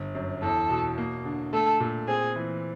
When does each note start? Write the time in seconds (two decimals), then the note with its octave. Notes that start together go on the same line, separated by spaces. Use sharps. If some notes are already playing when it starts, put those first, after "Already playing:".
Already playing: G1
0.15 F#2
0.43 E2 A4
0.70 B2
0.98 A#3
1.25 D3
1.53 A3 A4
1.80 A#2
2.08 C4 G#4
2.36 E3